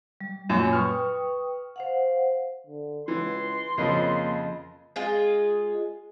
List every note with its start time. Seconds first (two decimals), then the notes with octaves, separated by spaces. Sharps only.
0.21 G3
0.49 F#2 A#2 F#3 C#5 B5
0.73 B4 G5 C#6 D#6 F6
1.76 C5 F5 F#5
2.67 D3
3.08 C#2 E3 C6
3.78 F2 C#3 F3 A#3 D#5 B5
4.96 G#3 F4 G#4